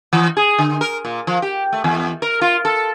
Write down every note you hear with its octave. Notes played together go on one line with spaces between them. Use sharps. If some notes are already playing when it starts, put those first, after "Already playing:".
E3
G#4
D3
A#4
A#2
F3
G4
A3
E2
A#4
F4
A4